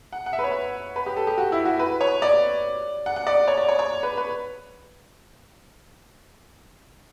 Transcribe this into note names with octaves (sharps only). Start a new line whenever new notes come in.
F#5
F#5
E5
B4
C#5
B4
G4
A4
G4
F#4
E4
F#4
B4
C#5
D5
F#5
F#5
D5
C#5
D5
C#5
C#5
B4
B4